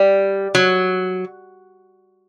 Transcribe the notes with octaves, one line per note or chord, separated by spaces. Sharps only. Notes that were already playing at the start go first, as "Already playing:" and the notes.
Already playing: G3
F#3